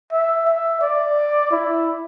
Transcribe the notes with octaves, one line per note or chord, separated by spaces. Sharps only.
E5
E5
D5
E4